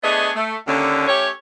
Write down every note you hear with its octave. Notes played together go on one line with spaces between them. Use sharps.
A3 B3 D4 G#4 C#5 D#5
A3
D#2 D3 C#4
A3 C#4 G4 C#5